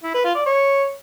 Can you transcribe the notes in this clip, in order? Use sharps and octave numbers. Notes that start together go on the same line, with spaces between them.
E4
B4
F4
D5
C#5